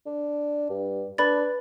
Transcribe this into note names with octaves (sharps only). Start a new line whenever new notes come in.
D4
G2
D4 B4 B5 A6